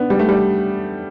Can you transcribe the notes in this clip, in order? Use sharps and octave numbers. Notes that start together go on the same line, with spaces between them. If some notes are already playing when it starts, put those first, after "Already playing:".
Already playing: B3 D4
G3
A3
G3